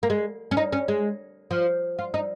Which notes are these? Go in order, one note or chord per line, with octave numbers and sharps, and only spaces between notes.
A#3
G#3
C#4
D#4
C#4
G#3
F3
F4
D#4